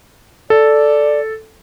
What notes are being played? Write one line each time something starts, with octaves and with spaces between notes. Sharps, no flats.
A4 D5